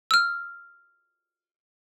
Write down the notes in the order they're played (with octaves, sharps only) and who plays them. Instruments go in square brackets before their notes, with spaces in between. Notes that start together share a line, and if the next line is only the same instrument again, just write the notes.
[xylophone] E6 F6